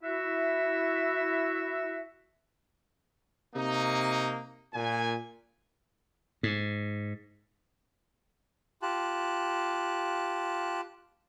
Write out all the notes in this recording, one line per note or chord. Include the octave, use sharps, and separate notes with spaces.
E4 F#4 E5
C3 A#3 D#4
A#2 G#5
G#2
F4 G4 A5 F#6